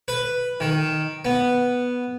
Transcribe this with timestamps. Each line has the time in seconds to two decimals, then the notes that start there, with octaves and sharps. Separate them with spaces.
0.08 B4
0.60 D#3
1.25 B3